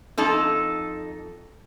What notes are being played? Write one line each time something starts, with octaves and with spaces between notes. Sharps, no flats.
F2 D#4 A4